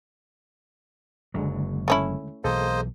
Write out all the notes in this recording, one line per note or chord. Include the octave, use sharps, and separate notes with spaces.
F#1 D#2 D3 F#3 G#3
A3 C#4 E4
B1 E3 A#3 G#4 A4 C5 D#5